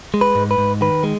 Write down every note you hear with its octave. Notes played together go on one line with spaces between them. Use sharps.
G#3
B4
G#2
B4
G#2
D#3 B4
G#3